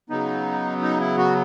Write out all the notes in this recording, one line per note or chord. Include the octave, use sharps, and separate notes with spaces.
C#3 F#3 B3 D#4
D#4
E4
F#4